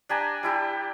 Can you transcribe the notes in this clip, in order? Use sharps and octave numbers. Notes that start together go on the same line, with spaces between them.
D4 G4 G#5 A#5
G3 E4 G4